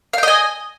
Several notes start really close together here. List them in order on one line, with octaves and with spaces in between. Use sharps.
F5 G5 D#5 G#5